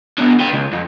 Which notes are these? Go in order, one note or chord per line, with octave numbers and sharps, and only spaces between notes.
D3 B3
B4 G5
C#2
F2